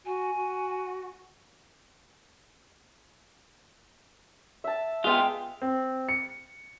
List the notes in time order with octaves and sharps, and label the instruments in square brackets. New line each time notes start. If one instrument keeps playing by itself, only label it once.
[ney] F#4 [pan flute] G#5
[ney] F#4
[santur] E5 A5
[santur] G#3 F5 G5 [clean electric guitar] B3 F4
[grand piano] C4
C#7